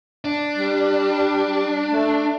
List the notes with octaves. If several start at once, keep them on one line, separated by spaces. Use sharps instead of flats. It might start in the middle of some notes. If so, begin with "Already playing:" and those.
D4
G3
A3